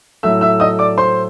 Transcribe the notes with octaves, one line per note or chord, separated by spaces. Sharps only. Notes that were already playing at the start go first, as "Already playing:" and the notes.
A2 F#3 A3 E5 E6
E5 E6
D#5 D#6
D5 D6
C5 C6